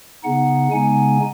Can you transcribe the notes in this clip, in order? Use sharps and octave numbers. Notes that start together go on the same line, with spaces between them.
C#3 B3 D#4 F#5
C#3 G#3 B3 D#4 G#5